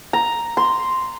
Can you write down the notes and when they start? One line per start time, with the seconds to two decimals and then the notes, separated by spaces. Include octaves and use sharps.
0.13 A#5
0.57 C6